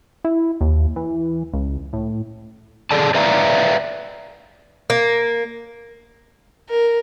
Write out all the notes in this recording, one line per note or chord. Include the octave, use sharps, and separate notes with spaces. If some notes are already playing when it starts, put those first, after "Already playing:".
E4
D#2
E3
C#2
A2
G#4 A4 D5 A5
B4 D5 E5 F5 A#5
A#3
A#4